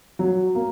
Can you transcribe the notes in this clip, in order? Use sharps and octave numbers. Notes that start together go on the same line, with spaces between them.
F#3
A#3